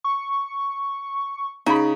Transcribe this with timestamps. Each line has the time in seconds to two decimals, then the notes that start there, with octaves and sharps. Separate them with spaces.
0.04 C#6
1.66 C#3 D#4 B5